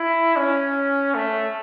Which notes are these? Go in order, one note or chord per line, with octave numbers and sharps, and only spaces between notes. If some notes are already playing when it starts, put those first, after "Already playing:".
Already playing: E4
C#4
A3